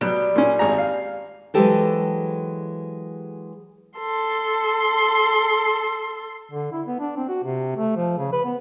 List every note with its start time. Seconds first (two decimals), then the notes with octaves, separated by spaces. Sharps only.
0.01 B2 F#3 G3
0.35 A#2 C#4
0.59 G#1 G#4 A#5
0.78 F5
1.54 E3 F#3 G#3 G4 A4 C5
3.99 A4 C6
6.51 D3
6.72 E4
6.87 B3
7.00 D4
7.17 C4
7.29 F#4
7.44 C3
7.77 A3
7.96 F3
8.19 C#3
8.32 B4
8.45 B3